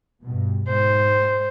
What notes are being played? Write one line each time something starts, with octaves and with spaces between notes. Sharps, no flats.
G2 B2
G#2 C5